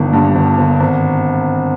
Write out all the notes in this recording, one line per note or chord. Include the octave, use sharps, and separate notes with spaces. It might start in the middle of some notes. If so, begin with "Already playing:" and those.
Already playing: G1 G2 D#3
G2
G1
G1
G#1